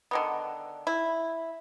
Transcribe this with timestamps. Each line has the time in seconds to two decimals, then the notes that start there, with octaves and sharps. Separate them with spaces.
0.11 D3 D#3 B3
0.87 E4